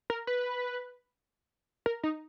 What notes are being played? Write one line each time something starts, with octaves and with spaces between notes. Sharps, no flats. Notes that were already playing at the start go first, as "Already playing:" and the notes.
A#4
B4
A#4
D#4